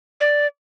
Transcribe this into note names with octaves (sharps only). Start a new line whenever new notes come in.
D5